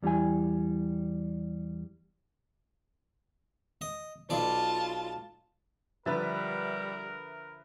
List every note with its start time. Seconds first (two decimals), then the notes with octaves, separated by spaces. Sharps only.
0.03 E2 G3 E4 G4 G#5
3.81 D#5
4.30 B1 B2 F4 D5 A5
6.06 D3 F3 G3 A#4 B4 E5 A6